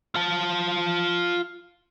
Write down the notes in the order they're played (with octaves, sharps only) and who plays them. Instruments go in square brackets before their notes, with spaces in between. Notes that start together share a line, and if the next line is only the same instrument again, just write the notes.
[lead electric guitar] F4 A5